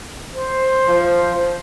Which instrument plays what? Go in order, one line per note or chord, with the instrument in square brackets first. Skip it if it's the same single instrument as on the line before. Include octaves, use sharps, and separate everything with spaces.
[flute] C5
[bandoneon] F3